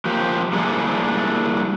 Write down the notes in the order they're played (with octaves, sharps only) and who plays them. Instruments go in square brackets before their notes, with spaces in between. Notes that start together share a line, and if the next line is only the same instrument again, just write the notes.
[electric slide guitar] F3 A#3 G4
G3 A#3 D4 E4 G#4 A4